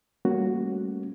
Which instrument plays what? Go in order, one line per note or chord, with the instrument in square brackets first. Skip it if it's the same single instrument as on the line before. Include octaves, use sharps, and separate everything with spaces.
[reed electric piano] G3 A3 A#3 C#4 F#4